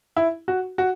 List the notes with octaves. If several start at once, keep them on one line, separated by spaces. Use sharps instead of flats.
E4
F#4
F#4